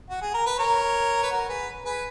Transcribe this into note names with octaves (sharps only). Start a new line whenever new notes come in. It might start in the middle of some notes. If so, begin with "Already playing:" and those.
F#4
G#4
A#4
B4
A#4 C#5
B4
F#4 A#4
G#4 B4
G#4 B4